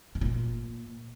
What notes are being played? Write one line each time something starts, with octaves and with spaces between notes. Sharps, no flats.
C#3
C3
A#2